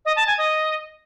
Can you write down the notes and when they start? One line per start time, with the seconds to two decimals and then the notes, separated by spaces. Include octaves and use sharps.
0.05 D#5
0.16 A5
0.27 G#5
0.38 D#5